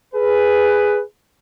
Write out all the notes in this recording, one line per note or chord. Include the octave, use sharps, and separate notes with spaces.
G#4 B4